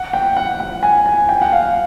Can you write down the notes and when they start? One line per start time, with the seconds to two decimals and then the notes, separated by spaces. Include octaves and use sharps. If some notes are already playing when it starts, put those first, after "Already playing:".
Already playing: F#5
0.13 G5
0.37 F#5
0.60 F#5
0.83 G#5
1.06 G#5
1.29 G5
1.42 F#5
1.52 F5